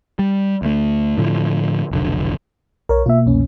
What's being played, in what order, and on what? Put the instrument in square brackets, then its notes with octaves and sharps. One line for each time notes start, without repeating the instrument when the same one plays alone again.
[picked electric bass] G3
D2 A3
A2 D3 F3
F1 B1 D3
[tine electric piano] B1 [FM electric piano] A#4 C#5
[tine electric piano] B2 A#3 [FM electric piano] F4 E5
[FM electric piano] C2 F2 C#4